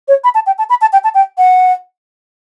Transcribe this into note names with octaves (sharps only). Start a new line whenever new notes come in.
C#5
B5
A5
G5
A5
B5
A5
G5
A5
G5
F#5